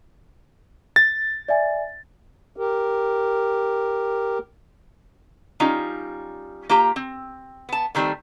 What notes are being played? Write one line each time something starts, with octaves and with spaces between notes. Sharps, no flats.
A6
D5 E5 G#5
G4 A#4
G3 C#4 D#4 F4
A#3 F4 G4 A#5
C4
B3 A5
D3 D#3 G3 A3 C4 C5